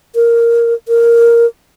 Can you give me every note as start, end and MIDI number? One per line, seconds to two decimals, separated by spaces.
0.15 0.74 70
0.88 1.46 70